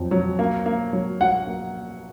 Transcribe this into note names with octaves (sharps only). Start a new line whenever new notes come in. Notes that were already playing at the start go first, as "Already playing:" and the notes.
Already playing: F2 F#3
F#3
A#3
A#3
F#3
F#3 F#5
A#3